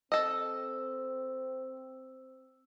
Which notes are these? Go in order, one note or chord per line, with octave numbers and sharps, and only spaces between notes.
C4 A4 D#5 E6